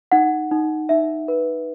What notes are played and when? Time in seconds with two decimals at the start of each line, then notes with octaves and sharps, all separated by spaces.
0.12 D#4 F#5
0.51 D#4
0.89 D#4 E5
1.28 B4